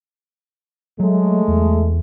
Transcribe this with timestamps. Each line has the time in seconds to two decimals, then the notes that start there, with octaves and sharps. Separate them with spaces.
1.00 F#3 G#3 A3
1.48 E2